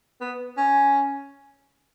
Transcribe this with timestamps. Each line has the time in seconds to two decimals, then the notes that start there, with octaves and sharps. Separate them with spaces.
0.21 B3
0.57 C#4